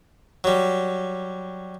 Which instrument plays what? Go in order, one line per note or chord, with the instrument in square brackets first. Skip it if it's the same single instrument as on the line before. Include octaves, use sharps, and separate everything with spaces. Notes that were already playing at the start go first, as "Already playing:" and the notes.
[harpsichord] F#3 G3